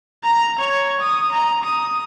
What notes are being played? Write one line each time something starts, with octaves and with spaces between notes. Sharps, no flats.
A#5
C#5
D#6
A#5
D#6